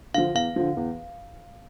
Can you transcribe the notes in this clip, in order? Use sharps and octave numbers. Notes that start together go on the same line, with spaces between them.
D3 F3 F5
E2 F5
D3 F3
E2